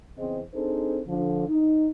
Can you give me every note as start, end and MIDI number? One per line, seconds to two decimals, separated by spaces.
0.18 0.40 40
0.18 0.40 49
0.18 0.40 60
0.18 0.40 68
0.18 0.40 72
0.18 0.40 75
0.54 1.00 60
0.54 1.00 62
0.54 1.00 63
0.54 1.00 68
0.54 1.00 69
0.54 1.00 72
1.07 1.47 50
1.07 1.47 53
1.47 1.88 63